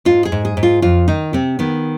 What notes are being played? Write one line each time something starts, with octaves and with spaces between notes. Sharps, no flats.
G#2 F4
G#4
G#2
G#4
G#2
F4
F2 F4
D#3 D#4
C3 C4
D#3 B3